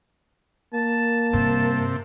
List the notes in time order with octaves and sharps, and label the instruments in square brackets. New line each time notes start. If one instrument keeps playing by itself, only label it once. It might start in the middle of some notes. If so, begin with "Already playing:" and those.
[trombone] A#3 [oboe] A5
[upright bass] G2 [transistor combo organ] C3